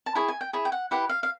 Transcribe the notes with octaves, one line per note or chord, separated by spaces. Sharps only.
A5
E4 G#4 C#5 G#5
G#5
G5
E4 G#4 C#5
G5
F#5
E4 G4 B4 F#5
F5
F5